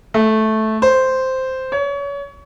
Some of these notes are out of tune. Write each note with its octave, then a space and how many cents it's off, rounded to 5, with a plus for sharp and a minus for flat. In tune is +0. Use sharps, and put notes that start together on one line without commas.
A3 -10
C5 -5
C#5 +30